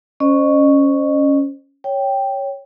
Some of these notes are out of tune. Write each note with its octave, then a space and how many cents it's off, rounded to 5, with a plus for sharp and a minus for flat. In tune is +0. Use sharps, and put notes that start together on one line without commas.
C#4 +0 C5 +0 D#5 -40
C#5 +0 G5 +0